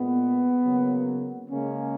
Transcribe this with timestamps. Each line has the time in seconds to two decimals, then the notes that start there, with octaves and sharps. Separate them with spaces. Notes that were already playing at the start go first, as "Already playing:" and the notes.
Already playing: A#2 G#3 B3
0.63 C#3 F#3 A#3
1.49 C#3 G#3 A#3 C#4